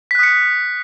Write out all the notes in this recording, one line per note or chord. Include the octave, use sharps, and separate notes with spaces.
D#6 F#6 B6 C#7